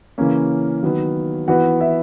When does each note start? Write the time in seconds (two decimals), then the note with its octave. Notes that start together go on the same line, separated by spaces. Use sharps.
0.18 C#3 E3 A#3 C#4
0.83 D#3 F#3 B3
1.48 E3 B3 F#4 F#5
1.80 E4 E5